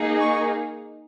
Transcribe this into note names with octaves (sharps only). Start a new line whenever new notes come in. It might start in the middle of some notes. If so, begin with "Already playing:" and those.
Already playing: A#3 D#4 G#4
C#6